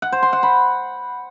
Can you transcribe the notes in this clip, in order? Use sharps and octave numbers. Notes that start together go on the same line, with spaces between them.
F#5
C5
C6
F#5
B5